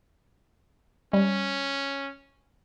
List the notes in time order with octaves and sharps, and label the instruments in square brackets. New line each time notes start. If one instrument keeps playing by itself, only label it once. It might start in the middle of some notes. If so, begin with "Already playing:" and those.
[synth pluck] G3 [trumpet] C#4